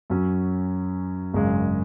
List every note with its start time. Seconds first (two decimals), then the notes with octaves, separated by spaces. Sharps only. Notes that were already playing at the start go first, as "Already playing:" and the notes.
0.10 F#2 F#3 C#4
1.34 G#1 F#2 C#3 G#3